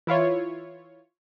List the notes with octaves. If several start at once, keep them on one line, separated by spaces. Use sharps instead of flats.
E3 E4 F4 C#5